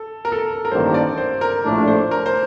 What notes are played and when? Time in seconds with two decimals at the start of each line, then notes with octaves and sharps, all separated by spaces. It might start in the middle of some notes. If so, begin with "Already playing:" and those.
Already playing: A4
0.25 A#4
0.32 A4
0.39 A#4
0.65 A#4
0.71 A1 G2 D#3 A#3 D4 C5
0.94 D5
1.18 C5
1.41 A#4
1.65 A#1 A2 A3 D4
1.88 C5
2.11 A#4
2.26 C5